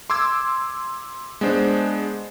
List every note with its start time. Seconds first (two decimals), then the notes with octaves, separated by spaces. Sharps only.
0.10 C6 D6 E6 G#6
1.41 G#3 B3 D4 C5